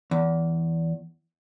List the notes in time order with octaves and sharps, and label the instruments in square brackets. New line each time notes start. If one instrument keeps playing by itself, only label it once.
[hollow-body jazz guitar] E2